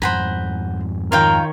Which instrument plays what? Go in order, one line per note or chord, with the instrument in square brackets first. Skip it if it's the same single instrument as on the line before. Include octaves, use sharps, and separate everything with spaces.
[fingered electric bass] F2 G#2 [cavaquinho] C5 F#5 A#5 [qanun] G#5 B5
[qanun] D#3 C#5 [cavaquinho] F4 F5 G5 [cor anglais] A#4